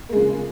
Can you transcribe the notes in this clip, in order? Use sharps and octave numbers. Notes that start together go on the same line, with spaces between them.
C#3 F3 G#3 A#3